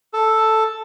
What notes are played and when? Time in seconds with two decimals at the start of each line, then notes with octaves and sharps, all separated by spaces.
0.13 A4